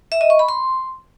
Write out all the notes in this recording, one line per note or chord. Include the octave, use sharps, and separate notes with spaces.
E5
D#5
C#6
B5
C6